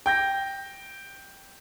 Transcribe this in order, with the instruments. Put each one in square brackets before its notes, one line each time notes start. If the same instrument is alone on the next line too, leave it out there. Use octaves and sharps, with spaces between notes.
[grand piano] G5 G6 A#6